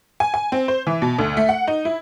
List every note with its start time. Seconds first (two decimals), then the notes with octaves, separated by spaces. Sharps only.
0.20 G#5
0.34 G#5
0.52 C4
0.68 C5
0.87 E3
1.02 B2
1.18 D2
1.37 A3
1.49 F#5
1.67 D#4
1.85 E4